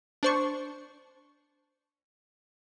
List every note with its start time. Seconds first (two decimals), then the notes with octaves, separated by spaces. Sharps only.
0.23 D4 C5 C#6